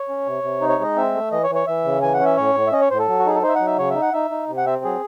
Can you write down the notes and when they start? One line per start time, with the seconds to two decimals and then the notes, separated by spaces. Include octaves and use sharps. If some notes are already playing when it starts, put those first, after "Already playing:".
Already playing: C#5
0.09 C#4
0.26 C3
0.43 C3
0.61 D#4
0.69 C#5
0.79 G#3 D#5
0.96 C4 E5
1.15 A3
1.32 E3 D#5
1.44 C#5
1.50 E3
1.55 C#5
1.67 E3 E5
1.85 C#3
2.02 E3 G#5
2.14 F#5
2.20 C#4
2.26 E5
2.37 A2 C#5
2.55 A2
2.67 E5
2.72 C#4 D#5
2.81 C#5
2.90 A2 C5
2.99 A4
3.08 F#3
3.19 F#4
3.26 D#4 G#4
3.35 A4
3.43 D#4 C5
3.49 E5
3.55 F#3 F#5
3.67 E5
3.78 C#3 C#5
3.91 D#4 E5
4.02 F#5
4.13 D#4 E5
4.30 D#4
4.48 C3
4.57 F#5
4.66 C4 E5
4.84 F#3 G#4